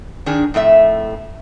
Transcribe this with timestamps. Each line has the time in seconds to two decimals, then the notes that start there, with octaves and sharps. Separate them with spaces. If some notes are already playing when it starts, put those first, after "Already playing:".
0.26 D#3 D4 G#4
0.54 F2 A2 A3 E5